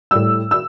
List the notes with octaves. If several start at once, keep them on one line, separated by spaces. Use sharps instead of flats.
A2 G3 E6
E6